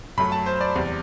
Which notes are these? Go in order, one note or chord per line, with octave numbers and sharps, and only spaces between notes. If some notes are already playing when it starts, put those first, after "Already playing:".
F#2 F#3 A3 B5
A5
C5
D5
E2 C3 G3